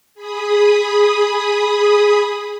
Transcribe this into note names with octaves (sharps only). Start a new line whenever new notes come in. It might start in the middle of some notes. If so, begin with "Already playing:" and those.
G#4 B5 D#6